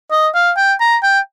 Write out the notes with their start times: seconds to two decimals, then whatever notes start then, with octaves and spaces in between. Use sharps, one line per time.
0.12 D#5
0.35 F5
0.57 G5
0.80 A#5
1.03 G5